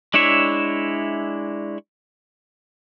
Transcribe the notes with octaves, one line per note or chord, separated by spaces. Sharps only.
G#3 D4 E4 C#5 E5